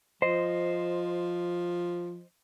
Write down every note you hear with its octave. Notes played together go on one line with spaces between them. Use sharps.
F3 C5 D#5